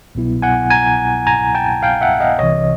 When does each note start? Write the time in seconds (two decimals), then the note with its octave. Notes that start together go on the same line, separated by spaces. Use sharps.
0.15 C2 B2 F#3 B3 E4
0.42 F#5 G#5
0.71 G#5 A#5
1.27 G#5 A#5
1.55 G5 A5
1.83 F5 G5
2.01 E5 F#5
2.14 F#5
2.20 D#5 F5
2.38 C2 C3 E3 C#5 D#5